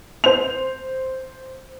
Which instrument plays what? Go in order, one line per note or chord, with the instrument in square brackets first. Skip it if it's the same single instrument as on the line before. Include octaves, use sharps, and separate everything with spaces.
[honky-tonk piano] C5 F7